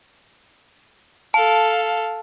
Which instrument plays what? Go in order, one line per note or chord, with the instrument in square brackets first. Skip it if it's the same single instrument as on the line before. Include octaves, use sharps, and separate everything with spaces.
[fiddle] A4 F5 [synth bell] A5